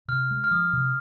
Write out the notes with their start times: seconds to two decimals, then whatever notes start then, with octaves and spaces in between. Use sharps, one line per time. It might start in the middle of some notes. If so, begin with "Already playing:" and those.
0.08 C3 F6
0.31 G#3
0.44 F6
0.51 F3 D#6
0.73 C3